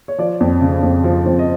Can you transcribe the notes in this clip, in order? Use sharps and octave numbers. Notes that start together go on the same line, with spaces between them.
C#5
F3 D5
F2
C#3
F2
F3
F2
D#5